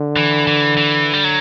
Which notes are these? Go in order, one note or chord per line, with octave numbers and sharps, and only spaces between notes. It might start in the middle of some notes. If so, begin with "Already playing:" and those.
Already playing: D3
E3
E3
E3
G3
F#3